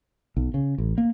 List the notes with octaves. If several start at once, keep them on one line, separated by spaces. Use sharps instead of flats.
B1
C#3
A1
A#3